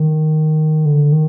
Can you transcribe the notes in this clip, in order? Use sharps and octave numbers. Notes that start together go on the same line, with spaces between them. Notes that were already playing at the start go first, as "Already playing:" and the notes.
Already playing: D#3
D3
D#3